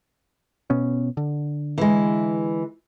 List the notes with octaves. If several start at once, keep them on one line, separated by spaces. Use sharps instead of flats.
B2 B3 C#4
D3
E3 G#3